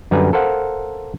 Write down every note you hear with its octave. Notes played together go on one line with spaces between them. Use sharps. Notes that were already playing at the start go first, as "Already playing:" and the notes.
F#2 D3 G3 B4 G#5 A#5
A4 A#4 C5 F5 F#5